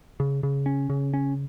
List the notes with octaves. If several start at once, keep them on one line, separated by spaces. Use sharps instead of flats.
C#3
C#3
C#4
C#3
C#4